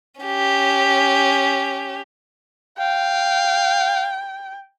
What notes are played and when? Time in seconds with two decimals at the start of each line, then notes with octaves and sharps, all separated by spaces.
0.21 C#4 G4
2.78 F5 G5